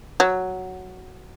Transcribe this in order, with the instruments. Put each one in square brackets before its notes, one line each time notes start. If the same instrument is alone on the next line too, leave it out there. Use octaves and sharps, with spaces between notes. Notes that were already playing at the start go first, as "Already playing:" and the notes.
[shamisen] F#3